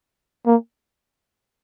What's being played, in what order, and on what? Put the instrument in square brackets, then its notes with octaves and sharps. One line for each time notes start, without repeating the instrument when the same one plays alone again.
[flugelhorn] A#3